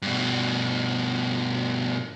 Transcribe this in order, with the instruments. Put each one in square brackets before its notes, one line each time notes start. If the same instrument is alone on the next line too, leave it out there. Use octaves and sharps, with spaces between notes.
[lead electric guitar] G2 B2